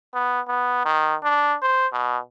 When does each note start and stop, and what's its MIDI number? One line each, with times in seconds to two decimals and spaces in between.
0.14 0.41 59
0.48 0.83 59
0.85 1.15 51
1.23 1.55 62
1.62 1.87 72
1.92 2.18 47